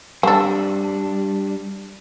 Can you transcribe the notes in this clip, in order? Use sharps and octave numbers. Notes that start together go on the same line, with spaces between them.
G3 C4 D4 A4